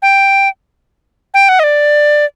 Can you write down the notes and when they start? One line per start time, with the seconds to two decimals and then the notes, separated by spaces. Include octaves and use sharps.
0.02 G5
1.34 G5
1.49 F#5
1.59 D#5
1.64 D5